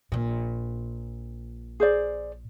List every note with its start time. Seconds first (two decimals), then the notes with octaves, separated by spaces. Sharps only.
0.12 A#1 A#2
1.80 G#4 C5 D5